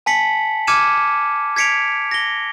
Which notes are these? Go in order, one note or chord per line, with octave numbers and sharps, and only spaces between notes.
G#5 A5 B6 C#7 F#7
D6 F6 G#6 C#7 D#7 E7
G#6 B6 C#7 D7 F7
A#6 G7